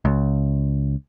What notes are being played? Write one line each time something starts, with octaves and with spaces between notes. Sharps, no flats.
C#2